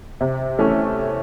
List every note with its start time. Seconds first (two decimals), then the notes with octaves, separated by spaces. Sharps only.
0.21 C3
0.59 E3 A3 C#4